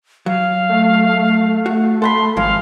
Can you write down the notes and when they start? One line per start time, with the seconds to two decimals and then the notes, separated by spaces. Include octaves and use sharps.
0.26 F#3 F5
0.69 A3
1.66 F#4
2.02 A4 F#5 B5 C6
2.37 G#1 D#3 F3 G#3 F5